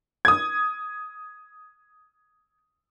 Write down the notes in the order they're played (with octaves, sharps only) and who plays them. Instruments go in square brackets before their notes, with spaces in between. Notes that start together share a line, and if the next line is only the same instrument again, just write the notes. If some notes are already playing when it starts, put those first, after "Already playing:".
[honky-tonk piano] D#6 G#6